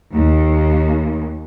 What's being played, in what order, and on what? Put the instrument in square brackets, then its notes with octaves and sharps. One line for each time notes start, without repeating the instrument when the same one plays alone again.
[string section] D#2